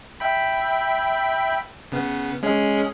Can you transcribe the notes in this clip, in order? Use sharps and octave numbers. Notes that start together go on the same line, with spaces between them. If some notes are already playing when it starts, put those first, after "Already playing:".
E5 G5 B5
C#3 B3
G#3 C#4 G#4